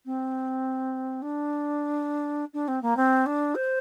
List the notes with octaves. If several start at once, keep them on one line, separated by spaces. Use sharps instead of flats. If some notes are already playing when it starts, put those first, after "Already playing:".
C4
D4
D4
C4
A#3
C4
D4
C5